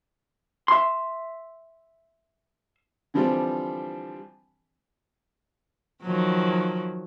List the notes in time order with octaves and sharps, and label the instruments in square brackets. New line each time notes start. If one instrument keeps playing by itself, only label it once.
[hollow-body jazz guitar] E5 C6
[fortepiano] D3 E3 F3 G3 C4 D4
[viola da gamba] D#3 F3 F#3